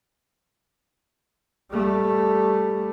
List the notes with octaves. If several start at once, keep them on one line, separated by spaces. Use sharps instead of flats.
G3 A3